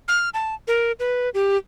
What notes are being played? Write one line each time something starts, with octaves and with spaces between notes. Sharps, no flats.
F6
A5
A#4
B4
G4